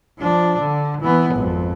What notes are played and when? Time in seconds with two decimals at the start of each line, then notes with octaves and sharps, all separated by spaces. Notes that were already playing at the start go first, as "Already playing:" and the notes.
0.18 F3 D4
0.60 D3
1.01 E3 B3
1.34 G#1 F2